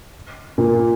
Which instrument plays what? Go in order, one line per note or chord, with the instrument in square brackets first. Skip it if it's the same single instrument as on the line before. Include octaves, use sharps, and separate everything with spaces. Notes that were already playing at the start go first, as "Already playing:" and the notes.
[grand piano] A#2